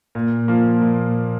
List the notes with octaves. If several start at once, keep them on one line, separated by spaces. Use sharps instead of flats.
A#2
F3 A#3
A#2